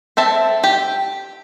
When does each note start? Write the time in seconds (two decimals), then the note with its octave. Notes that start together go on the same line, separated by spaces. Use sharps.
0.17 C4 A4 E5 A5
0.64 G4